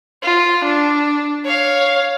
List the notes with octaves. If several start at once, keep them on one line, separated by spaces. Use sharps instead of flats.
F4
D4
C#5 F5